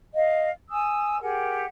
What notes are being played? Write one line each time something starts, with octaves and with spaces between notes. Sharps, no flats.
D#5 F5
G#5 D#6 E6
G4 G#4 A#4 F#5